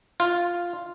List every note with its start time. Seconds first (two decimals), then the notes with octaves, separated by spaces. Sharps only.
0.20 F4